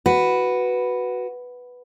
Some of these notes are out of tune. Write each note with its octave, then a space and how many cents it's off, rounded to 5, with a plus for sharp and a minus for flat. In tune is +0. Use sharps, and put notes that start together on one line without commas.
F#4 +0 B4 +0